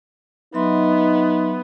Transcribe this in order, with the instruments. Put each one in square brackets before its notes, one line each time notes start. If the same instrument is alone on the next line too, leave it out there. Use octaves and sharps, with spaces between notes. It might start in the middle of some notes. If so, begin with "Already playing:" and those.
[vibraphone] F#3 E5 C6 [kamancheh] B3 [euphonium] D#4